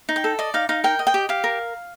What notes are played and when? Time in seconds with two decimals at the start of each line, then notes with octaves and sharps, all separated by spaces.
0.09 D#4
0.16 G5
0.24 A4
0.39 D5 D#5
0.54 D#4 F5
0.69 D#4 F5
0.84 A#4 G5
0.99 D#5
1.07 G5
1.14 G4
1.29 G4 F5
1.44 A#4